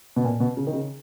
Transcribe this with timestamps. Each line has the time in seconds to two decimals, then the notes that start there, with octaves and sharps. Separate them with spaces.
0.16 B2
0.24 A#2
0.40 B2
0.57 C#3
0.67 D#3
0.73 C#3